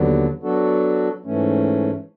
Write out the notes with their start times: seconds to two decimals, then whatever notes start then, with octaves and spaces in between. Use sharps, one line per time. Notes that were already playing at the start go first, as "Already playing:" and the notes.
Already playing: D#2 D3 F#3 B3 D4
0.43 F#3 B3 D4 F#4 A4
1.25 G#2 E3 A3 C#4